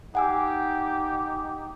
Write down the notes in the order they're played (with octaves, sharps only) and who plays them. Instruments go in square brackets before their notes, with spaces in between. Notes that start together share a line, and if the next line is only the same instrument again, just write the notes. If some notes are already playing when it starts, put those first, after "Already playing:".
[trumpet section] D#4 G4 [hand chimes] F#5 G#5 E6